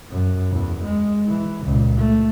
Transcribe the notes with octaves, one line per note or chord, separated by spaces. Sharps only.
F#2
E2
G#3
E3
C#2 A#2
A3